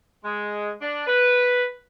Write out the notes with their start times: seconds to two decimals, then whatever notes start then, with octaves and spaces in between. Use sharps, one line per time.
0.24 G#3
0.81 D4
1.07 B4